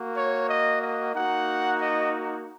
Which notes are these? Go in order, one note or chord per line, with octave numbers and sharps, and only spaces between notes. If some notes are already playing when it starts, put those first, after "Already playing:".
Already playing: A#3 F#4
C#5
D#5
D#5
A#3 D#4 F#4 F#5
D#5